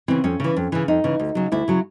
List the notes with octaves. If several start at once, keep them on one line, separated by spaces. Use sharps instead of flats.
C#3 E3 C4
F2 C#4
C#3 E3
F2
C#3 E3
F2 D#4
C#3 E3
D2
C#3 F#3
D2 E4
C#3 F#3